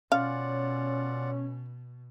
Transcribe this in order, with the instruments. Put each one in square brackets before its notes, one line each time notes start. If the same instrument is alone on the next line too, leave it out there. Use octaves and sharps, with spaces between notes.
[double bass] B2 [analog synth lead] C#4 [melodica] F4 D5 F#5 [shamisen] F5